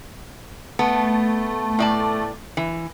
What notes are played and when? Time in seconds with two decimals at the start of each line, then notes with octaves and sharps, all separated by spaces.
0.79 A3 B3
1.79 A2 D5 A5
2.57 E3